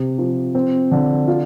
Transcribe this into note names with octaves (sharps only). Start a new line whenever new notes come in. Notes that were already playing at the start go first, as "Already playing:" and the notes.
Already playing: C3
F3
C4
D3
F4